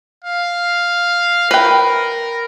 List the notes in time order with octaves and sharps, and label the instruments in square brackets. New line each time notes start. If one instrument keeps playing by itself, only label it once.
[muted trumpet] F5
[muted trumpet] A#4 [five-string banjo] B4 G5